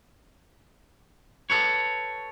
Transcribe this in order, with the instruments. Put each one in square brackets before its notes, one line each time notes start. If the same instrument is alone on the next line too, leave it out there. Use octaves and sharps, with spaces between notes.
[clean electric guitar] A4 B4 C#5